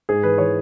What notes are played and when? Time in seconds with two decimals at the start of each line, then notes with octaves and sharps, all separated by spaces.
0.09 G#2 G#4
0.23 E3 B4
0.38 E3 C#5